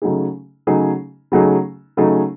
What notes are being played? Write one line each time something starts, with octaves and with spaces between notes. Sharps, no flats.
C#3 F#3 A3 D#4 G#4
C#3 F#3 A3 D#4 G#4
C#3 F#3 A3 D#4 G#4
C#3 F#3 A3 D#4 G#4